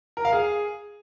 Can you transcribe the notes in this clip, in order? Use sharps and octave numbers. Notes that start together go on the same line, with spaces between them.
A#4
F5
G#4